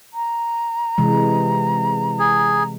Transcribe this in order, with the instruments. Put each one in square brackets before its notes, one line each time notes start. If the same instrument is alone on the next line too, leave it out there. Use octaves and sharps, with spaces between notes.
[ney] A#5
[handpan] C3 E3 G#3
[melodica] G#4